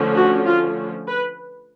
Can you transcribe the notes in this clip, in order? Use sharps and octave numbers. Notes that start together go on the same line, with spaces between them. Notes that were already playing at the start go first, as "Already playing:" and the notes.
Already playing: D3 F3 A3 C#4
F#4
F4
B4